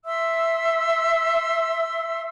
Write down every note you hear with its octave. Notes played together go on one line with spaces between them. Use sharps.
E5 C6 E6